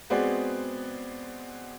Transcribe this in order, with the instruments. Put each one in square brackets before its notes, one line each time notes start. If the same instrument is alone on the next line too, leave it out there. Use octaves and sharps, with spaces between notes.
[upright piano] G#3 B3 C4 F#4 G#4 D5